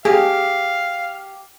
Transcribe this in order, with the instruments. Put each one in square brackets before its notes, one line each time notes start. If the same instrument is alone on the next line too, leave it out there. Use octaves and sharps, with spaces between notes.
[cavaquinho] G4 [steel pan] G#4 [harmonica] F5